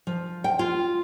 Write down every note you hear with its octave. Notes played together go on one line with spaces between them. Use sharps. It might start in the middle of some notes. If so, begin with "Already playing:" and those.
F3
G5
F4